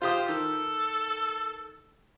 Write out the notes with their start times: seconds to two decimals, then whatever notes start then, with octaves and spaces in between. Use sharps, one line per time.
0.02 F4 G4 C5 D#6
0.29 D#3 A4